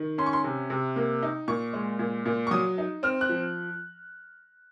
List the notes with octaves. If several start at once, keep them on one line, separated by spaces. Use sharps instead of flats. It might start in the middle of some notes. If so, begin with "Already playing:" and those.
Already playing: D#3
C#4 C6
C#6
C6
C3
C3
A#3
D#4
A#2 C#6
G#3
A#2
A#2
C#6
F#3 D#6
D#4
C4 F6
F#6
F3